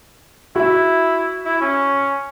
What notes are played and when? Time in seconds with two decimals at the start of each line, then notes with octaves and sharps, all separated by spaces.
0.56 E4 F#4 E5
1.46 E4
1.61 C#4